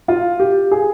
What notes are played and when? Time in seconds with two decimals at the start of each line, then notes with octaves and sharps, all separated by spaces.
0.08 F4
0.40 G4
0.71 G#4